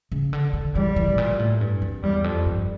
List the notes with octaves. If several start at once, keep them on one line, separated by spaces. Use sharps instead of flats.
C#3
D3
D3
E3 G3
E3
A2
A#2
A2
G2
F2
E2 G3
F2
G2